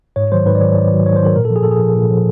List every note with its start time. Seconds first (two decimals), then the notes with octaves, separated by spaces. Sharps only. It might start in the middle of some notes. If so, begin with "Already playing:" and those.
0.16 G#2 C#5
0.32 D#3 F#3 C5
0.46 G#2 B4
0.55 D5
0.61 D#3 F#3 C#5
0.76 G#2 D5
0.90 D#3 F#3
1.06 G#2 C#5
1.16 C5
1.20 D#3 F#3 A#4
1.36 A#2 A#4
1.45 A4
1.50 F3
1.56 G#4
1.63 A#2 A4
1.71 G#4
1.80 F3
1.95 A#2
2.10 F3